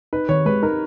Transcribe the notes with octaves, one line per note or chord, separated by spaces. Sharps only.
D#4 B4
D#3 C#5
G#3 B4
D#4 A#4